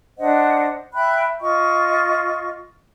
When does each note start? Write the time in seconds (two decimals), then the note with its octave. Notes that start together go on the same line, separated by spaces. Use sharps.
0.17 D4 C5 D#5 F#5
0.94 E5 G5 B5 F#6
1.41 F4 D#5 C#6